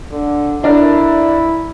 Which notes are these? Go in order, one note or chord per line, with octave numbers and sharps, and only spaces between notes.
D3
D3 D4 E4 A#4